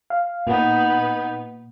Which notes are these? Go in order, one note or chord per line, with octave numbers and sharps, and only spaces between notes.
F5
A#2 B3 D#4